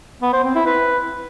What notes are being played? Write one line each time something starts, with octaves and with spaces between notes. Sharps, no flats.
B3
C5
C4
E4
B4